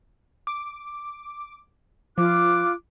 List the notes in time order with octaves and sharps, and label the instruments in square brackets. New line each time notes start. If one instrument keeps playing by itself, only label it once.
[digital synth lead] D6
[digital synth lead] F3 [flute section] F4 F#6 [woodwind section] D6